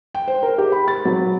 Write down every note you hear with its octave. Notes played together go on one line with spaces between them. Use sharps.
G5
C5
A#4
G4
B5
A6
F#3